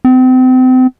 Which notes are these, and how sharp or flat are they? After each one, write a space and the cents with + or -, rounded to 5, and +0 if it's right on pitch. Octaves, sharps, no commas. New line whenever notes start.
C4 -35